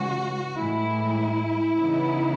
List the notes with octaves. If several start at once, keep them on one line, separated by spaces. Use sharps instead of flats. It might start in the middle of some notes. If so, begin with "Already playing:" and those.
Already playing: C#3 E3 G#3 F#4
A2 E3 G#3 E4
C#3 E3 B3 D#4